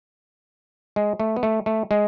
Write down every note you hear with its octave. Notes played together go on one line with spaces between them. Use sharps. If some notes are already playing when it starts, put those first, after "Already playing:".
G#3
A3
B3
A3
A3
G#3